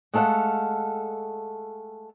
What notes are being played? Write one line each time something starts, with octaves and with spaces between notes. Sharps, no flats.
G#3 A3 A4 F5 F#5